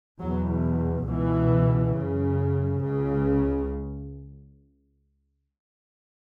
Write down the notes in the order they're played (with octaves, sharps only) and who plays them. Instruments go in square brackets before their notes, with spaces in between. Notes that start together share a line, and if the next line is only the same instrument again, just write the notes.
[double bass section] E2 B2 F#3
C#2 B2 E3
F#2 C#3
C#2 C#3